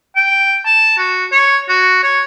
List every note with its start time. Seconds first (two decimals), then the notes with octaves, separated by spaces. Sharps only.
0.16 G5
0.66 A5
0.98 F#4
1.32 C#5
1.69 F#4
2.03 C#5